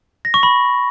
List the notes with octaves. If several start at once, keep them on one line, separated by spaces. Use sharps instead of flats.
A#6
C#6
B5